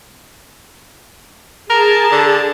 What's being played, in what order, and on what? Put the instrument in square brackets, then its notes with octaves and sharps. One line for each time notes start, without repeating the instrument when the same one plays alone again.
[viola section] G#4 A5 [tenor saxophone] A#4
[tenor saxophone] D3